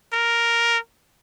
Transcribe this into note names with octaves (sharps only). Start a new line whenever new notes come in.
A#4